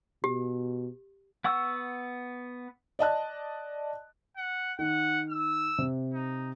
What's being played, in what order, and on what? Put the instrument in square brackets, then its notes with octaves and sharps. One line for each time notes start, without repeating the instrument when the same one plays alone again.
[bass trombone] B2 [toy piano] G4
[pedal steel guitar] B3 F#5 C#6 E6
[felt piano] D5 D#5 A5 F#6
[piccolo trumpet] F#5
[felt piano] D#3 [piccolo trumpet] F#5
[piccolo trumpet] E6
[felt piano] C3
[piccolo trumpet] D#4